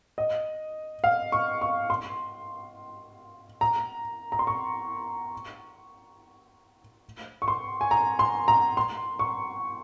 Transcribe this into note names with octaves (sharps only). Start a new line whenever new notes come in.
D#5
F5
C#6
C#6
C6
A#5
A#5
C6
C#6
C#6
C6
G#5
A#5
C6
A#5
C6
C#6